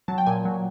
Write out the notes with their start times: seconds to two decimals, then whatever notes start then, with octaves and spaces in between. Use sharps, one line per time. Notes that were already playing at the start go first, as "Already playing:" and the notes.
0.08 F#3 A5
0.18 G5
0.26 A#2 G#5
0.45 F#3